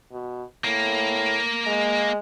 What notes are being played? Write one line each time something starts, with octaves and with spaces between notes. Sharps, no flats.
B2
A2 A#3
G#3